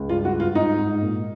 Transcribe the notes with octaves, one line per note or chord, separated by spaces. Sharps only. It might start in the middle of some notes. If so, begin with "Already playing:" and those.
Already playing: C#2
G2 F4
F#4
G2
F4
G#2 D#4
G#2
A#2